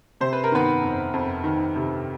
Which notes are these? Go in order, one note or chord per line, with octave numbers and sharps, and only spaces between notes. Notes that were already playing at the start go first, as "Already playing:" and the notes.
C3 C5
B4
A#4
D#3 B3 B4
F2
F2
D#3
C3